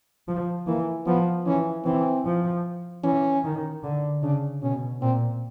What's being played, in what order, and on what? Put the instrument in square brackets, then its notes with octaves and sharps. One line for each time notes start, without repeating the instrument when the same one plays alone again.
[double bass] F3
[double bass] E3 [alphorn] A#3
[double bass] F3 [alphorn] B3
[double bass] E3 [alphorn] C#4
[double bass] E3 [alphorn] C4
[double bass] F3
[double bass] E3 [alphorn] C#4
[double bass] D#3
D3
[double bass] C#3 [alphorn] D4
[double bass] B2 [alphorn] C#4
[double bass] A#2 [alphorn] C4